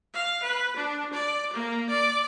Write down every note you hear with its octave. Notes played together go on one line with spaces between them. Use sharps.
F5
B4
D4
D5
A#3
D5